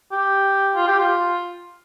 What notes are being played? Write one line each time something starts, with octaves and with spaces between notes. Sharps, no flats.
G4
F4
G4
F4